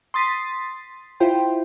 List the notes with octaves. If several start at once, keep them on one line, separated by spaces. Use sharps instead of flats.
C6 D#6 A6 B6
E4 F4 C5 G5